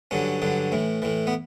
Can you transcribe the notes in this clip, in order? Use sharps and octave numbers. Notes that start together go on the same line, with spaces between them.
G2 D3 F#3 C#4
G2 D3 F#3
A2 E3
A2 E3
B3